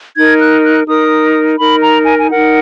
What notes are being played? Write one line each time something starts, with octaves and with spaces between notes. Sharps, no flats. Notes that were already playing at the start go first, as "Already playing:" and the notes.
D#4 A#4 G#6
F#6
F#6
D#4 A#4 D#6
D#4 A#4 B5
A#5
G#5
G#5
D#4 A#4 F#5